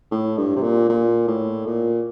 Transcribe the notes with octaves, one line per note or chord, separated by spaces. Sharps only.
A2
G2
C3
A#2
A#2
A2
A#2